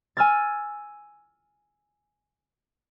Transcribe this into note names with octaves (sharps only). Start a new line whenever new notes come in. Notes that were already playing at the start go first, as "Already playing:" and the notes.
G#5 E6 F6 G#6 A6